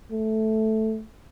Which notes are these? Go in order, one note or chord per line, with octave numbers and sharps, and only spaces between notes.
A3